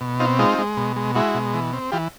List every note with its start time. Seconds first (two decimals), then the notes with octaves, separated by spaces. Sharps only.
0.01 B2
0.20 C4 D#4 F4
0.39 G#3 D#4 F4
0.58 G#3
0.77 B2
0.96 G#3
1.15 G#3 E4 F#4
1.35 B2
1.54 E3
1.73 C4
1.92 E3 F4 G4